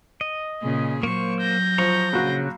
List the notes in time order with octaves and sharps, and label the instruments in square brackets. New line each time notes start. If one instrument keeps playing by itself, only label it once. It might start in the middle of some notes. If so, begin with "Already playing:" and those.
[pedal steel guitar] D#5
[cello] A#2 C#3 [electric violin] G#4
[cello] F#3 [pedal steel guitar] A#3 C5 [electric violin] C#6
[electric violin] G6 A#6
[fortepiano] F3 [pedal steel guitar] A#5 C#6
[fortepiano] A#1 F#4 [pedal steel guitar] C#3